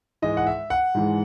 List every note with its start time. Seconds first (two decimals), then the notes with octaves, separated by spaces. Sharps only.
0.22 G#2 E3 G#3 D#5
0.37 F#5
0.47 E5
0.70 F#5
0.95 G#2 E3 G#3